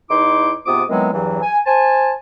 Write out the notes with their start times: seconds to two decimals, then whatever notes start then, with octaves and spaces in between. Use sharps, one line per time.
0.09 E2 D#4 E4 C6 D6
0.66 G#2 C3 B3 F4 D6 D#6
0.89 D#3 E3 F#3 G#3 B3 C4
1.12 E2 G2 E3 F#3
1.42 G#5
1.66 C5 G#5 A5